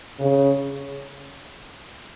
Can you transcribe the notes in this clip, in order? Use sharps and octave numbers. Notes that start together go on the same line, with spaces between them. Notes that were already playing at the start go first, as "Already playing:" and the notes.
C#3